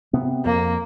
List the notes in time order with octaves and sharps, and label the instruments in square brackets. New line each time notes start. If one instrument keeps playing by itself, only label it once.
[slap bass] C3 B3
[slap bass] F2 [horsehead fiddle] A#3